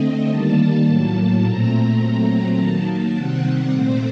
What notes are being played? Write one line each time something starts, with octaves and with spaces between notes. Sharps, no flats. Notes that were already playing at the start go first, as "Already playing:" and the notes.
Already playing: D3 A3 C4 D#5
D#3 G3 A#3 A5
A2 F#3 A#3
A#2 A3 C4 A#5
A#2 F#3 A3 C4
D#3 F#3 A#3 A5
C3 D#3 G3 C4 F#5
F#5
A#2 A3 C4 C5